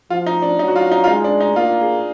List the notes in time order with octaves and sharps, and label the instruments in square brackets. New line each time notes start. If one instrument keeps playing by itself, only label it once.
[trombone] F3 [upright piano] F4
[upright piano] D#4
D4
[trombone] F#3 [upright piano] D#4
[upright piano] F#4
F4
D#4
F4
[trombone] G#3 [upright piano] D#4
[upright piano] D4
D#4
[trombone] A#3 [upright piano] F4
[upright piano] G#4